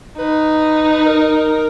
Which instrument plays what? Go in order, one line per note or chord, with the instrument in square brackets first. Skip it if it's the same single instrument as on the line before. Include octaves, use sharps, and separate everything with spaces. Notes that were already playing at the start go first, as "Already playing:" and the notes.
[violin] D#4 [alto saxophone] B4
[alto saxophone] A#4